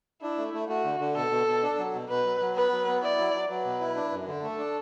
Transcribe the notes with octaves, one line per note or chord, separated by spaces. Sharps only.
D4 E4
A3
A3
A3 F#4
D3
D3
B2 A4
B2
B2
D4
F#3
B2
B2 B4
F#3
F#3
B3 B4
F#3
B3
E4 D5
F#3
F#3
F#3 B4
B2
E4
D4
F#2
D3
A3 A4
D4